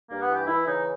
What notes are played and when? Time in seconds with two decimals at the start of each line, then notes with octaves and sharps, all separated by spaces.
0.08 G2 A#3
0.22 B3
0.28 E3
0.34 G4
0.47 E3 E4
0.66 C#3 D#4